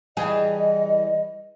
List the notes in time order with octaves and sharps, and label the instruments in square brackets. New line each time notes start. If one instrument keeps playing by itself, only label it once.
[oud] E3 G3 G#4 [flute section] D#5